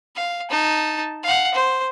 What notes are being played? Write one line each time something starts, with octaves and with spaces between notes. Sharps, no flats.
F5
D#4 A5
F5 F#5
C5